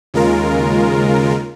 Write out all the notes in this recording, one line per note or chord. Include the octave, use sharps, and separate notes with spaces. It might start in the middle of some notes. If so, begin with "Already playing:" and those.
D#2 C#3 G#3 F4 A#4